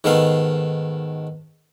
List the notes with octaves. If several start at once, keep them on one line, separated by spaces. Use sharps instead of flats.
G#2 D#3 A3 B3 F5